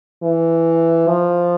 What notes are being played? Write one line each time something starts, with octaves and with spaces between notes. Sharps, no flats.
E3
F3